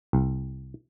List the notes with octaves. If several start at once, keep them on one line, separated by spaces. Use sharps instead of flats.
C2